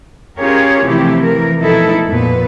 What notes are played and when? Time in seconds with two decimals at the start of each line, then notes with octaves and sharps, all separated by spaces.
0.38 C#4 F4 G4 G#4 A#4 C#5
0.86 C3 E3 F3 A3 E4 G4
1.23 E3 A#4
1.60 B2 F3 A3 D#4 E4 A4
2.07 F2 A#2 B3 B4